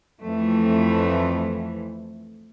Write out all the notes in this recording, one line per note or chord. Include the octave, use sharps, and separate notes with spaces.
F2 E3 A3